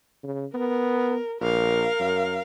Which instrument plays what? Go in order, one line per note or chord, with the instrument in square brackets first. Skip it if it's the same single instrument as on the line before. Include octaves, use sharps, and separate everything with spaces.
[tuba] C#3
[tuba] B3 [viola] A#4
[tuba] A#1 [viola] A#4 F5
[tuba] F#2